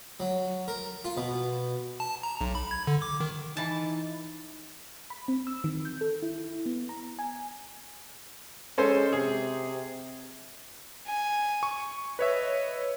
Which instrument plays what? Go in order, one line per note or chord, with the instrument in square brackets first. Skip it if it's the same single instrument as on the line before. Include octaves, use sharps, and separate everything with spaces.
[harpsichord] F#3
A#4
F4
B2
[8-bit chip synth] A5
A#5
B1
B5
G#6
D3
D6
D#3
[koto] E3 A5 [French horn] D#4
[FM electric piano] B5
C4
E6
D#3
G6
A4
E4
B3
A#5
G#5
[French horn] G#3 [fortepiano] C#4 A4 C5
[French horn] C3 [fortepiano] G#4
[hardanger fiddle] G#5
[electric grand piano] C#6
[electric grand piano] B4 C#5 E5 [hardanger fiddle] D#5